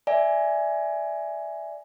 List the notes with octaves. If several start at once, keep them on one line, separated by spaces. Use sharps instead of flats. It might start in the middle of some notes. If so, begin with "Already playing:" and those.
D5 E5 G#5